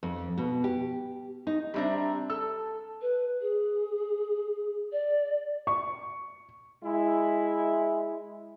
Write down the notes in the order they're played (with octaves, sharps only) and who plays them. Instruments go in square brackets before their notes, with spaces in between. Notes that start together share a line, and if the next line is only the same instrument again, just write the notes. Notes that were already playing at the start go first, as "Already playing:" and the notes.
[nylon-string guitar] F2
B2
G4
D#4
[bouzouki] C3 E5 A#5 [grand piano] G3 C4 D4
[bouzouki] A4 [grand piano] E6
[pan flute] B4
G#4
D5
[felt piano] C#6
[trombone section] G#3 E4